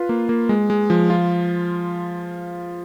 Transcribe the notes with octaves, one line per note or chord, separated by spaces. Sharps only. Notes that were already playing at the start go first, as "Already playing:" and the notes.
Already playing: F4 B4
A#3
A#3
G#3
G#3
F3
F4